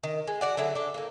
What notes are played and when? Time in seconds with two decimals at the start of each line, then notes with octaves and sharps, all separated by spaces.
0.03 D#3
0.27 G#3
0.41 F#4 D5 F#5
0.57 D3 F#3 E4 G#4
0.75 D4 A4
0.94 A2 A#3